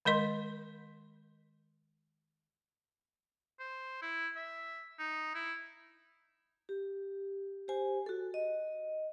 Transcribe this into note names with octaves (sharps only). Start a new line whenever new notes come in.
D#3 G#3 A#4 D#5 C6
C5
E4
E5
D#4
E4
G4
G4 C5 G#5
F#4 A4
D#5